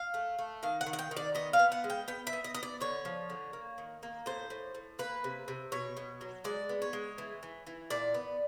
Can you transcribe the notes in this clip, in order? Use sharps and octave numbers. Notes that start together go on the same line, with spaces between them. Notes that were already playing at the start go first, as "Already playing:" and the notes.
Already playing: F5
A3
A3
D#3 F5
F#5
D#3
F#5
G5
D#3
D5
B3 D#5
F5
B3
F#5
G#3
G5
B3 G5
E5
B3
D#5
B3 D#5
D5
D3 C#5
F3
D3
A#3
D#3
A#3
A2 C5
A2
A2
A#3 B4
C3
C3
B2 C#5
B2
F#3
G#3 D5
B3
C#5
G#3
E3
E3
E3
A#2 D5
B3